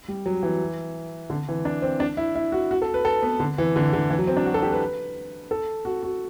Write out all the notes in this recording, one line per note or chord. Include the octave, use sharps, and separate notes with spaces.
G3
F#3
E3
D3
E3
D4
C4
D4
E4
E4
F#4
F#4
A4
B4
A4
B3
D3
E3
D3
D3
E3
F#3
C4
D4
F#4
A4
G4
B4
A4
F#4
F#4